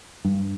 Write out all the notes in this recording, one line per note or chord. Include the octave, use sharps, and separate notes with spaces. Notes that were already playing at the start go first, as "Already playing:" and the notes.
G2